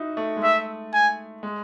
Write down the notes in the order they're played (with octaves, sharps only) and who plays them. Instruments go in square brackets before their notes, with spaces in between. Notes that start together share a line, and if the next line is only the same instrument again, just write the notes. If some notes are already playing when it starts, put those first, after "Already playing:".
Already playing: [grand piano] D#4 E4 F#4
A3
G#3
[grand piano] A3 [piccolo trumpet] E5
[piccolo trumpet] G#5
[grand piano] G#3